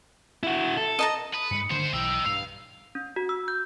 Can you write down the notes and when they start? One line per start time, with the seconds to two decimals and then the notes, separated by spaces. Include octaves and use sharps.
0.43 E4 F#4
0.77 A4
0.99 D#5 A5 A#5
1.34 B4 D#6
1.51 G2 G#3 C#7
1.70 G#2 D3 D#3 A#3 C5
1.93 B1 E3 D#4 G5 E6
2.26 G2 F5
2.95 C#4
3.16 F#4
3.29 E6
3.48 G6